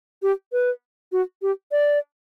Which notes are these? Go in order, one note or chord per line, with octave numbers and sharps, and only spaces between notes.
G4
B4
F#4
G4
D5